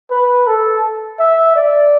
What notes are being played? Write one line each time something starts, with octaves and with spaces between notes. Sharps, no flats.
B4
A4
E5
D5